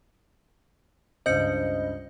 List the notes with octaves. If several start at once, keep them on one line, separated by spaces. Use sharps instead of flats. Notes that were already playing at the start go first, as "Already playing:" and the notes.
C#2 G2 C5 D#5 G6 C#7